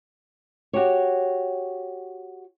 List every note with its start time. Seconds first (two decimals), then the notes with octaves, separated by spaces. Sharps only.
0.73 F#4 G4 C#5